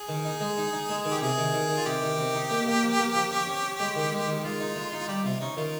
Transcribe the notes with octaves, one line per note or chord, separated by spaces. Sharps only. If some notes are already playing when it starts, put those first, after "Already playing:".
Already playing: G#4
D#3
D#4
G#3
D#4
D#4
G#3
D#3
G4
C3 G#4
D#3
D#3
D#3
F4
C3 G4
D#3
C3
D#4
A#3
A#3
F3
A#3
F3
C#4
C#4
C#4
G#3
D#3
G#3
D#3
G4
G#3 F4
D#4
G#3
D#4
G3 G4
C3 F4
C#4 D#4
D#3 F4